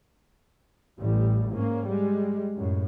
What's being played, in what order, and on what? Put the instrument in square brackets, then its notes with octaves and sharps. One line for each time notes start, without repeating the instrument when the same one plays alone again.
[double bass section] A1 G3
G#2 A#3 C#4
G3 G#3
F#2 A2